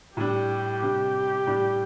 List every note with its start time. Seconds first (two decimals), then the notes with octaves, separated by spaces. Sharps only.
0.16 A2 G3 D4 G4
0.82 C3 G3 D4
1.47 A2 G3 D4